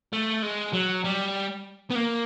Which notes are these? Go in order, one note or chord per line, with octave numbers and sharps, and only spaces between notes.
A3
G#3
F#3
G3
B3
A#3